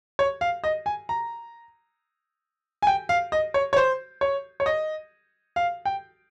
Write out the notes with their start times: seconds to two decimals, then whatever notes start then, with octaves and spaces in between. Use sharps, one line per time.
0.19 C#5
0.41 F5
0.64 D#5
0.86 G#5
1.09 A#5
2.82 G#5
2.87 G5
3.09 F5
3.32 D#5
3.54 C#5
3.73 C#5
3.77 C5
4.21 C#5
4.60 C#5
4.66 D#5
5.56 F5
5.85 G5